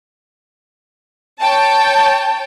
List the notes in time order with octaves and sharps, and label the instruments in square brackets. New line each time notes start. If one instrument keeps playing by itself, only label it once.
[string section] C#5 G5 A5